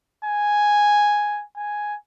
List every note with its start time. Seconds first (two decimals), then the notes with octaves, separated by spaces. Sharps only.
0.25 G#5
1.56 G#5